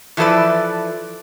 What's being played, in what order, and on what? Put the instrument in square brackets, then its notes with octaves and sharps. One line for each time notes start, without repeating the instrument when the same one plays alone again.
[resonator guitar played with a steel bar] E3 F3 E4 A4 B4 D5